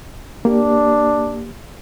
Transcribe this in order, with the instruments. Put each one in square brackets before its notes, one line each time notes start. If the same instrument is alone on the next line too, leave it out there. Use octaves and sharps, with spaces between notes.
[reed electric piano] A#3 G4 [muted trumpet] D4